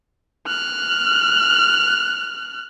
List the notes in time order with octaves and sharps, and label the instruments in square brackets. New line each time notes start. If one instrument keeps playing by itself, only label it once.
[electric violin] F6 F#6